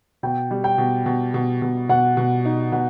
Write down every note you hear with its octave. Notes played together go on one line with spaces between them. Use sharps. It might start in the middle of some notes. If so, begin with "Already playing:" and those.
B2 G5
G3
G5
B2
B2
B2
B2
B2 F#5
B2
D#4
B2 F#5